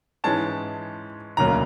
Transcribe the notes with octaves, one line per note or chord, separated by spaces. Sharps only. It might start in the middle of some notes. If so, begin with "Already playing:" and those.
G#2 E3 G#3 C#4 A5
E1 D2 C#3 F#3 A#3 A#5